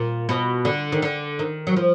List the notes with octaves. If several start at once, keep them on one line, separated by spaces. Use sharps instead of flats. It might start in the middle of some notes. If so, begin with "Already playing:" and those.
Already playing: A#2
B2
D3
D#3
D3
D#3
F#3
F3